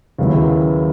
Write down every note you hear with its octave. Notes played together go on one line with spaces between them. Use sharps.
D#2 C#3 F#3 B3 E4